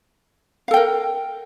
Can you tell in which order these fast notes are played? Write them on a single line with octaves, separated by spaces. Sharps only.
F5 A4 G5 A#4